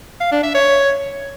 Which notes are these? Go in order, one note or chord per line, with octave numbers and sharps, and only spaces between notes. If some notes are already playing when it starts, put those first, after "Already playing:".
F5
D4
E5
C#5